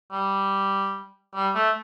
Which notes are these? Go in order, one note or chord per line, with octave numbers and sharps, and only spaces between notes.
G3
G3
A3